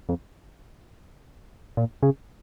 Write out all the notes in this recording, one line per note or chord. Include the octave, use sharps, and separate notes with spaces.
F2
A#2
C#3